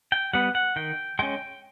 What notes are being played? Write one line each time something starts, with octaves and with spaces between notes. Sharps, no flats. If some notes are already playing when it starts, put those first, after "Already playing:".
G5
G3 B3 F#5
F#5
D#3 G5
G#3 C#4 G5